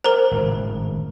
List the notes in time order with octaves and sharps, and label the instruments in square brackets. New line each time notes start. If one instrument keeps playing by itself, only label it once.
[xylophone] A#4 A#5 [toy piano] C5
[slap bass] G#1 A2 C#3